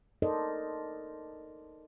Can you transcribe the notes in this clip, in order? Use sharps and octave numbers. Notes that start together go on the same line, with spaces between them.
D#4 A4 A#4 C5 D5 D#5